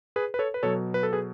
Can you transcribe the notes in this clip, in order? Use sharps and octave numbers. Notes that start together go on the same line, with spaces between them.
G#4 B4
B4
A4 C#5
B4
B2 F#3 A4 C#5
B4
A4
G#4 B4